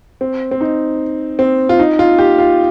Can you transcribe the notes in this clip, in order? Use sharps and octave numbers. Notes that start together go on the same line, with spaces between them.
C4
C4
D#4
C4
F4
D#4
F4
G4
F4